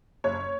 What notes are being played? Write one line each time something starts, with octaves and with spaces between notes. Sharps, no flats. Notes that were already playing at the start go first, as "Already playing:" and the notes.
F#1 C#5